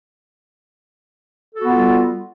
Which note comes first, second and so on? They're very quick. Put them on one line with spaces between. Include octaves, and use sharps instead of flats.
A4 F#4 B3 F4 G3